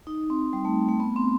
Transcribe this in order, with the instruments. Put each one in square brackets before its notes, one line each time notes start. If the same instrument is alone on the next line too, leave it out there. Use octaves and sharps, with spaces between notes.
[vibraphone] D#4
C4
G3
A3
A3
B3
C4